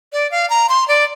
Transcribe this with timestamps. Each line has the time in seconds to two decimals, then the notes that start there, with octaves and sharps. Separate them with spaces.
0.13 D5
0.31 F5
0.50 A#5
0.69 C6
0.88 D5